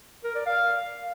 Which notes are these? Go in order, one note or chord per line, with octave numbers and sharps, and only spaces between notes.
A#4
D5
F5